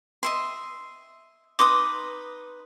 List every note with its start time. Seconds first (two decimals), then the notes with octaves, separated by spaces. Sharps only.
0.23 D#5 E5 C6
1.59 D#4 B4 C6 D6 D#6